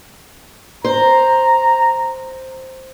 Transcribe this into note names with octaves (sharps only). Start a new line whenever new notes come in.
C5 A#5